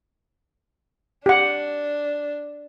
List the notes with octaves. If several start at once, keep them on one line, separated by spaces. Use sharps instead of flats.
D4 G4 F#5